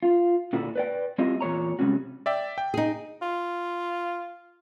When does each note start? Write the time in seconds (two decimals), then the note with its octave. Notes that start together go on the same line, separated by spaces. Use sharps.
0.03 F4
0.53 A#2 D3 E4 F#4
0.76 B4 D5 G5
1.18 G3 C4 E4 F4 G4 D#5
1.41 E2 A#2 C#5 A#5
1.79 C3 G3 G#3 C#4 F#4
2.26 D5 E5 G5
2.58 G5
2.74 D#4 G#4
3.22 F4